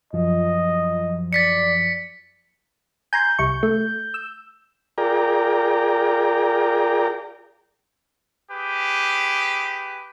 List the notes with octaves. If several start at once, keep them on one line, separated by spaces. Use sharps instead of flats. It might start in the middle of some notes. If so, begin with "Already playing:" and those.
F#2 F3 D#5
D5 A6 B6 C#7
G#5 A#5 C6 G6
C2 C#6
A3
E6
F4 G#4 A#4 D5 G5 A#5
G4 G#4 B4